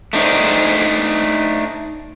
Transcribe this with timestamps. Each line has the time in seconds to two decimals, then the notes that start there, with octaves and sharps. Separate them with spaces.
0.13 A3 D4 D#4 C5